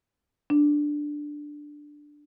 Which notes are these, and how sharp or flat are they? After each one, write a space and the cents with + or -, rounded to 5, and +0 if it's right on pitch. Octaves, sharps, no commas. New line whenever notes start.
D4 +5